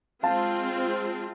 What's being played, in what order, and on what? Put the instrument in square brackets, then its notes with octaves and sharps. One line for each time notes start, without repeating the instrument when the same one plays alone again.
[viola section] G#3 C4 F4 [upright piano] F5 A5